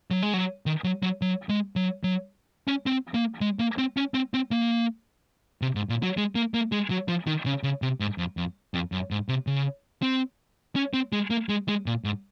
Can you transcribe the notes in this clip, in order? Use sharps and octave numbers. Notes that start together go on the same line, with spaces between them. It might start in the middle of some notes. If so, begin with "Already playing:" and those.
F#3
G#3
F#3
D#3
F#3
F#3
F#3
G#3
F#3
F#3
C#4
C4
A#3
G#3
A#3
C4
C#4
C4
C4
A#3
C3
G#2
A#2
F#3
G#3
A#3
A#3
G#3
F#3
F3
D#3
C#3
C#3
C3
G#2
F2
F2
F2
F#2
G#2
C3
C#3
C4
C#4
C4
G#3
A#3
G#3
G#3
A#2
G#2